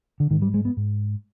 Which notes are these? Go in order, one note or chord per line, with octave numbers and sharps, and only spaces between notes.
D3
G#2 D#3
G3
G#3
B3
G#2